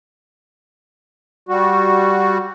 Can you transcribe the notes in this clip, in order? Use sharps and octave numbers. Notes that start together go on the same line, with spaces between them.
G3 F#4